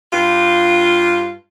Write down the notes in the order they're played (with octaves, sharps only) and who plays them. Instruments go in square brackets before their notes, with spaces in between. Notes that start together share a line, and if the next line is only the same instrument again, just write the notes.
[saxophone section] G2 F4